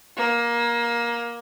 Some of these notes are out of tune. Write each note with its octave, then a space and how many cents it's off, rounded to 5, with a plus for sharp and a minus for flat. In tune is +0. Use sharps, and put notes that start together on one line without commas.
A#3 +20